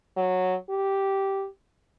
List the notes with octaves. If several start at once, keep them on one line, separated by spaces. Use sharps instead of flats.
F#3
G4